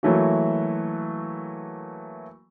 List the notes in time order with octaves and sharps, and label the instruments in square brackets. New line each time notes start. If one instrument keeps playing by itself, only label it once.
[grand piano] E3 F#3 A3 A#3 F#4